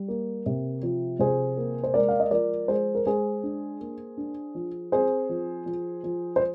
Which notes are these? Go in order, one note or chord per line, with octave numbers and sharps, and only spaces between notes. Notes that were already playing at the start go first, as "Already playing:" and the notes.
Already playing: G3
A#3
C3
F3
C3 G#4 C5
A#3
C5
G#3 A#4 D5
F5
D#5
F3 A#4 D5
G#3 G#4 C5
A#4
G#3 G#4 C5
D4
A#3
D4
F3
C4 G#4 C5
F3
F3
F3
C5